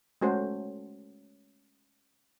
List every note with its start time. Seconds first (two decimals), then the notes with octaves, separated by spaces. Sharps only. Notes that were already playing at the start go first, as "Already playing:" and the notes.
0.21 G#3 A3 C#4 F#4 A4 C5